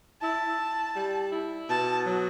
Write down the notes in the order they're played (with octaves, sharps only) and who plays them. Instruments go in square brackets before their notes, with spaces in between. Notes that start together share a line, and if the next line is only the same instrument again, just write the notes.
[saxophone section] E4 [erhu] A5
[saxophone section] E4
G3
E4
[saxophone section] B2 [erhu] A5
[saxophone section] F#3